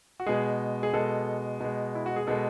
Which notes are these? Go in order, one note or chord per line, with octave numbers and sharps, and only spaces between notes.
F#4
B2 G#3 G#4
G#4
B2 G#3 A4
B2 G#3
E4
F#4
G#4
B2 G#3 A4